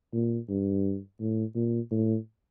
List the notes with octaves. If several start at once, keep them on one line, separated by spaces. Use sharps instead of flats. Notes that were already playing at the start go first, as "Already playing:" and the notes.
A#2
G2
A2
A#2
A2